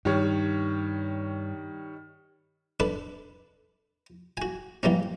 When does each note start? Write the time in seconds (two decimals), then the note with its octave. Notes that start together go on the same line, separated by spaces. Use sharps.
0.05 G2 D#3 G3 C#5
2.80 D4 A4 B4
4.37 F#4 G#5
4.83 E3 G3 A#3 C#4